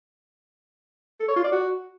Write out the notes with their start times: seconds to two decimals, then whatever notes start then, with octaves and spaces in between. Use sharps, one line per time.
1.20 A4
1.28 C#5
1.36 F4
1.44 D5
1.52 F#4